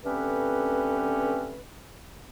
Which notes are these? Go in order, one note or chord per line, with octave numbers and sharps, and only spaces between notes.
D3 A3 C4 C#4 G4 B4